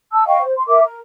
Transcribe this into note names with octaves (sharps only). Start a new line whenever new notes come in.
A5 E6
D#5 F5 G5 C#6
C5
C6
A#4 E5 D6
A#4